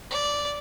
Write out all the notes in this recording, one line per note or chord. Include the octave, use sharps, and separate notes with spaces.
D5